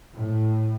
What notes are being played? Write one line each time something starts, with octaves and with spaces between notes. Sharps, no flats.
A2